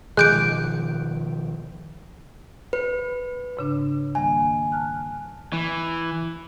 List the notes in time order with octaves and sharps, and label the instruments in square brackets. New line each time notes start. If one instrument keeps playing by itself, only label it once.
[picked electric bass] B2 D#3 F3 [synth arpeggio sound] G#3 D6 [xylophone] F#6 G6 D7
[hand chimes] B4
[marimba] G#2 C#3 D4
[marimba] D#3 G3 A#3 [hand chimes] G#5
[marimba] A5 F6 F#6
[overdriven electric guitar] E3